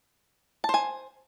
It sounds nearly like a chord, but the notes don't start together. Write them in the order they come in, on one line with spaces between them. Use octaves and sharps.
A5 C5 G#5